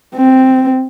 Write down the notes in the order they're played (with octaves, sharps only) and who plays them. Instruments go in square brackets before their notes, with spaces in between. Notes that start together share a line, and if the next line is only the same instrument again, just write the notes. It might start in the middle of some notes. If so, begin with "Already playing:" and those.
[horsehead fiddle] C4